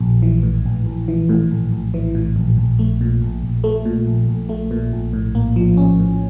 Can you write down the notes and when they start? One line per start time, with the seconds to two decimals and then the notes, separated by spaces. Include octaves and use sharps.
0.01 A#1
0.22 E3
0.43 A2
0.66 A#1
0.86 A#1
1.08 E3
1.29 A2
1.51 A#1
1.72 A#1
1.94 E3
2.15 A2
2.36 A#1
2.58 A#1
2.79 A3
3.01 A#2
3.22 A#1
3.43 A#1
3.64 A3
3.85 A#2
4.07 A#1
4.29 A#1
4.49 A3
4.71 A#2
4.93 A#1
5.13 A2
5.35 A#3
5.56 F3
5.77 C#4
6.00 A2